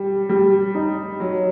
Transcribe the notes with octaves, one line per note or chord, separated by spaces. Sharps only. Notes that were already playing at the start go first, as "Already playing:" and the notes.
Already playing: G3
G3
D#4
F#3